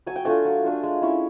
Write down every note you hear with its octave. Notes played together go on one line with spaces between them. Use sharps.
F#3 G#5
G5
A3 D4 F4 G#5
F#3
A3 D4 F4
G#3
C#4 E4